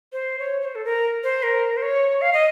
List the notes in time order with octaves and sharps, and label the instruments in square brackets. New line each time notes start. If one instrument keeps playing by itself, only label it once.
[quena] C5
C#5
C#5
C5
A4
A#4
C5
A#4
C5
C#5
F5
D#5